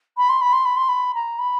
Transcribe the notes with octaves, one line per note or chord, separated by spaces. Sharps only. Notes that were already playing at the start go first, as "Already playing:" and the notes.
B5
C6
B5
C6
B5
C6
B5
A#5
B5